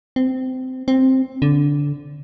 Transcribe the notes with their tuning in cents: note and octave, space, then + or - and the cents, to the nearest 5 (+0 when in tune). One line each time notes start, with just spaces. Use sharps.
C4 -20
C4 +5
D3 -20